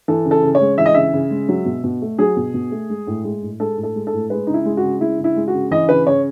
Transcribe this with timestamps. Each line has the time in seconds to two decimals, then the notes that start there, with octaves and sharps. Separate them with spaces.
0.08 E3 A4
0.25 C#3
0.31 A4
0.43 C#3
0.55 C#5
0.61 G#3
0.78 E3 E5
0.86 D#5
0.94 C#3 E5
1.14 C#3
1.31 G#3
1.49 F#3
1.66 B2
1.84 B2
2.02 A3
2.19 F#3 G#4
2.37 B2
2.54 B2
2.72 A3
2.90 G#3
3.07 A2
3.24 G#3
3.42 A2
3.60 G#3 A4
3.77 A2
3.83 A4
3.96 G#3
4.07 A4
4.13 A2
4.30 G#3 B4
4.47 C#3 D#4
4.54 E4
4.65 G#3
4.77 F#4
4.83 C#3
5.00 G#3 E4
5.19 C#3
5.24 E4
5.36 G#3
5.48 F#4
5.54 C#3
5.71 E3 D#5
5.89 C#3 B4
6.07 C#3 C#5